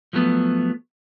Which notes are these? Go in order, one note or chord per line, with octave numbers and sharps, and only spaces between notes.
F3 F#3 A3 B3